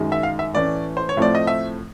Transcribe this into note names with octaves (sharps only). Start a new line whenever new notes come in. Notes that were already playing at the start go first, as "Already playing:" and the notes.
Already playing: F#2 D#3 G#3
E5
F5
E5
A2 E3 A3 C#4 D5
C5
C#5
A2 F3 A3 C4 D5
D#5
E5